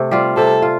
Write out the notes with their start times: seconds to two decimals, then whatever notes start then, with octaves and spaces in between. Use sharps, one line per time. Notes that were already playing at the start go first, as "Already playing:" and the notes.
Already playing: C3 A3
0.11 G3 F4
0.37 C3 A4
0.62 F4